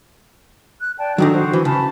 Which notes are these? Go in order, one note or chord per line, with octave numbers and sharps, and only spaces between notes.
F#6
D5 G5 A5
D3 D#3 F#3 D4 D#4 F#4
F#4 C5
E3
C#3 A5 B5